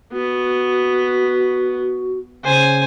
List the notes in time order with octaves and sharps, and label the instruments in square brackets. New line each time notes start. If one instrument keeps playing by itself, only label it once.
[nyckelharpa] B3 [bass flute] F#4
[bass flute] C#3 [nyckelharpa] C5 G#5